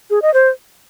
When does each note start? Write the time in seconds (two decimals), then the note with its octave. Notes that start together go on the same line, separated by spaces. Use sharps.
0.10 G#4
0.22 D#5
0.34 C5